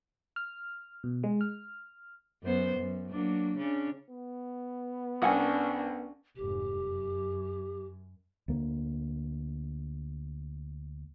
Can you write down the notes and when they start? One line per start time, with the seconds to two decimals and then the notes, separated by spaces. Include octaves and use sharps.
0.36 F6
1.04 B2
1.24 G#3
1.41 F6
2.43 F#2 B3 C5
2.77 F#2
3.10 F#3 A#3 D4
3.58 C#3 C#4 D4
4.10 B3
5.22 C2 C#4 D4 G#4 F#5 G#5
6.36 F1 G#2 G4
6.80 F#2
8.48 D2 A#3